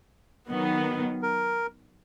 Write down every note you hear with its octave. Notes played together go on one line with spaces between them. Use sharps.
D#3 F#3 B3
A#4